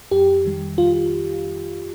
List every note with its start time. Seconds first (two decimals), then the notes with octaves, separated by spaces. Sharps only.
0.11 F2 G4
0.45 D#3 G3
0.78 F2 F4